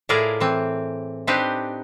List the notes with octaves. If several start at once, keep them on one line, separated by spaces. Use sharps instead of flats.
A2 E4 F4 G#4 A#4 D5
E3 C4
C4 D4 D#4 G4 B4 C5